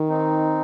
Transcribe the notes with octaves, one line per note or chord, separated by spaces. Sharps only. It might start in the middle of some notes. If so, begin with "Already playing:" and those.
Already playing: D#3
C4 D#4